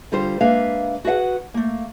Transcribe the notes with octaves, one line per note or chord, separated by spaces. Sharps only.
D3 G3 F4 C5
G#3 A#3 D4 B4 E5 F5
F#4 G#4 B4 E5 F#5
A3 A#3